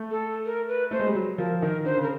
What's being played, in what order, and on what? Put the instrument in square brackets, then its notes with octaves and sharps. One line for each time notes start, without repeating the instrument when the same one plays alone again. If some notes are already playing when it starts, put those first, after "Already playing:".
Already playing: [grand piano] A3
[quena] A4
A#4
B4
[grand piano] A3 [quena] C5
[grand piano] G#3
G3
F#3
[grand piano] F3 [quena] A#4
[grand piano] D#3 [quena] A#4
[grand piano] D3 [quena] C5
[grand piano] C#3
[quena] A#4